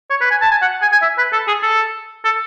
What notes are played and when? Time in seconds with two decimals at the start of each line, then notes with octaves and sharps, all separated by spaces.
0.10 C#5
0.21 B4
0.31 G#5
0.41 A5
0.51 G#5
0.61 F#5
0.81 G#5
0.92 G#5
1.02 E5
1.18 B4
1.32 A4
1.47 G#4
1.63 A4
2.24 A4